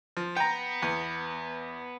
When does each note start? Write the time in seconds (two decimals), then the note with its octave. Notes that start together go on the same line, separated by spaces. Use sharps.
0.17 F3
0.37 B3 G5 A#5
0.82 E2